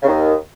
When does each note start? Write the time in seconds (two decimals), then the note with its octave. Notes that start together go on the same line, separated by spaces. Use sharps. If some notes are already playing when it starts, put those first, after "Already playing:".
0.03 C#3
0.07 D#2 D#3